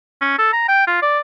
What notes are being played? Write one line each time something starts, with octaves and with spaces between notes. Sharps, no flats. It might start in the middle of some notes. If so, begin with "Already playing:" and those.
C#4
A4
A#5
G5
F4
D5